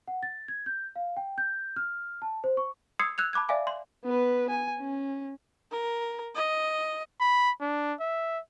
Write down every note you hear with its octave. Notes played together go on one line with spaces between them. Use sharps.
F#5
A6
G#6
G6
F5
G5
G6
F6
A5
C5
C#6
C6 D#6 E6 G#6 C7 C#7
E6 F#6 G#6 F7
A5 B5 D6 F#6 G#6
D5 E5 F5 G#5 D6
C6
B3 B4
G#5
C#4
A#4
D#5
B5
D4
E5